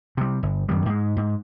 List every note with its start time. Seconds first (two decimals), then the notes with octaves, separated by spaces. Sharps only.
0.17 C3 G3
0.43 G1
0.69 F#2 D#3 G3
0.86 G#2 G#3
1.17 G#2